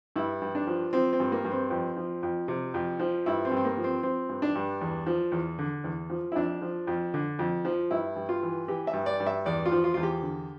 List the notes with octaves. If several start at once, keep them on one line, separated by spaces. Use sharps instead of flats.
G2 E4
G2
D4
F3
F3 C4
C4
G2
A#3
G2
C4
F2
F3
F2
C3
F2
F3
G2 E4
C4
G2
C4
A#3
F3
C4
F3 C4
G2
D4
G2
E2
F3
E2
D3
E2
F3
E4
F2 D4
F3
F2
D3
F2
F3
G2 E4
G2
F4
E3
E3 G4
E5
G2
D5
G2
E5
E2 D5
F4
F3
F4
E2 F4
G4
D3